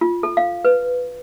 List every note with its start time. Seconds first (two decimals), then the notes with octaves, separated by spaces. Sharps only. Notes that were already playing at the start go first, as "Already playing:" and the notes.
0.01 F4
0.23 A4
0.37 F5
0.65 B4